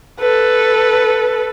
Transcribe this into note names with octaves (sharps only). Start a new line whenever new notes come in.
A4 B4